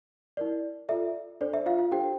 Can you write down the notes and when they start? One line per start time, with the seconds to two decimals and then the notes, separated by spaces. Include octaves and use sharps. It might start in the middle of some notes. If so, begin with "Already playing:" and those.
0.37 E4 A#4 D5
0.89 F4 A4 D5 E5
1.41 D4 A4 C5 D5
1.53 E5
1.66 F4 F5
1.78 F4 F5
1.91 D4 F4 G4 A4 C5 G5